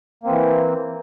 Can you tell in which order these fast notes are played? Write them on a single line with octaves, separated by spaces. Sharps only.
A#3 C4 E3